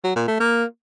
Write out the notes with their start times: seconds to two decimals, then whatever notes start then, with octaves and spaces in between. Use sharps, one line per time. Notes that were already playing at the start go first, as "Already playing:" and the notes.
0.04 F#3
0.16 A#2
0.28 A3
0.40 A#3